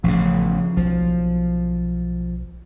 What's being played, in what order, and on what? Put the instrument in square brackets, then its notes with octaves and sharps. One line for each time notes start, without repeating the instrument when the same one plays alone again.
[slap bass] A1 C#3 [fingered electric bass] F3
[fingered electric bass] B1 [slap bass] F3